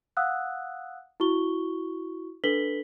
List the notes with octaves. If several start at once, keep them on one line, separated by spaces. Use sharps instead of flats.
F5 F#5 D#6 E6 F#6
E4 F#4 C#6 G7
D4 A4 B4 B6 F#7 G7